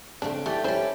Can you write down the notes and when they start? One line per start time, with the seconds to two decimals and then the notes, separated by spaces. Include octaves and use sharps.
0.22 C#3 A3 C4 D4
0.46 E3 G3 A3 G4
0.64 C#4 E4 G4 C5